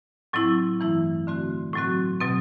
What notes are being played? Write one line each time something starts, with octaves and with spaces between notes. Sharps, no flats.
A2 F#3 C4 E4
G2 E3 A3 E4
D3 A3 C4 F#4
A2 F#3 C4 F#4
B2 F#3 C4